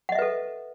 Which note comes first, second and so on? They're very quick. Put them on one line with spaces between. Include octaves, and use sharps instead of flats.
F#5 D#5 E5 B4 A4